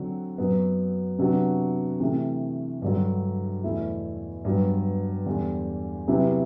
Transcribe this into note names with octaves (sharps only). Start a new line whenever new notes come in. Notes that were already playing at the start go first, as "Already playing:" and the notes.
Already playing: D3 F#3 C4 F#4
F#2 F#3 B3
C3 F#3 B3 D4 F#4
C3 E3 A3
G2 D3 F#3
E2 B2 A3 E4
G2 F#3 B3
E2 D3 G3
C3 F#3 B3 E4 G4